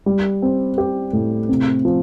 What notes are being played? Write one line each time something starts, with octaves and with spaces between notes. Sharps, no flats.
G3
C4
G4
A2
C3
F3